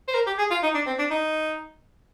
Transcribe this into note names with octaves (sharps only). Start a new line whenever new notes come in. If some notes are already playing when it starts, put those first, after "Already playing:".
C5
A#4
G4
G#4
F4
D#4
D4
C4
D4
D#4